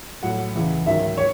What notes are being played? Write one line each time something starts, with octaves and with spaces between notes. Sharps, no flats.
A2 F#3 F#5
C#2 C#3 E3 G#3
G#2 D#3 F#3 E5
C#5